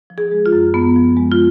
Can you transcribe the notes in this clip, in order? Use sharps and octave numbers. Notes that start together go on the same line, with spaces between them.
F3
G#4
G#3
F4
F#2
F#2 B3
F3
G#3
F4